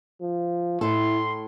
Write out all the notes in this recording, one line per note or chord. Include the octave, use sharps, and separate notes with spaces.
F3
A2 E4 A4 C6